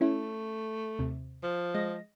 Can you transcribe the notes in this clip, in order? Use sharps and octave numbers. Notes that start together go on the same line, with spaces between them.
A3 C#4 E4
D#2 C3
F3
G#3 D#5 A#6